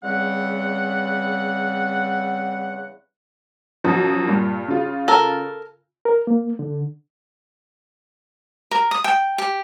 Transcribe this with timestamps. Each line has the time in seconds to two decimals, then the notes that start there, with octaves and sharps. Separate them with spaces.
0.03 E2 C#3 G3 C4 F#5
3.84 F#2 B2 F3
4.28 G2 A#2
4.68 C#3 F4
5.08 A4 A#4
6.05 A#4
6.27 A#3
6.59 D3
8.71 A#4
8.91 D#6
9.04 G5
9.38 G4